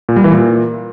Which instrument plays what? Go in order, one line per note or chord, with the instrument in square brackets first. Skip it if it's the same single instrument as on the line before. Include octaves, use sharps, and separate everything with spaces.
[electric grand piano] A#2
G3
E3
A#2